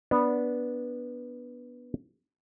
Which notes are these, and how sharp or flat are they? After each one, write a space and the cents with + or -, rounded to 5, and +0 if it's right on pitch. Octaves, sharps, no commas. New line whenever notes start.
B3 -10 D4 -5